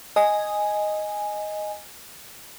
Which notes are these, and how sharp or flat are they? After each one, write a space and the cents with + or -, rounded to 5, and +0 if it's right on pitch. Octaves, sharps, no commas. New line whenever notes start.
D#5 +0 G#5 +0